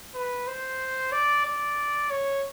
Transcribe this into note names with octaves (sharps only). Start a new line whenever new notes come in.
B4
C5
D5
D5
C#5